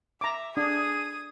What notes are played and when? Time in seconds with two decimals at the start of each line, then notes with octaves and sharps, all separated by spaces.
0.21 E5 A#5 D6
0.57 D4 G#4 D#6